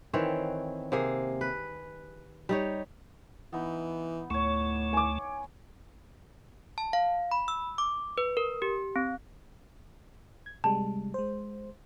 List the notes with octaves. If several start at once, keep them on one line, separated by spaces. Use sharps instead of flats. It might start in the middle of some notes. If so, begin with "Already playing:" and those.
D#3 E3 C4 C#5
C3 A#3 G#4
B4
G3 D#4 C#5
E3 B3 D#4
D2 A2 A3 C#5 C#6
G#5 D6
A5
F5
B5
E6
D6
B4
A#4
G4
C4
G#6
C3 G3 G#3 A5
G#3 C5